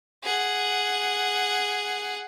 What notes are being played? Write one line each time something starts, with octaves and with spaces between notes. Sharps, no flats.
G#4 F#5